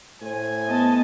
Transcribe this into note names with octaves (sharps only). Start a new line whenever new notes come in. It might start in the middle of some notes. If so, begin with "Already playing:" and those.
A2 C5 G#5
B3 D#5 A5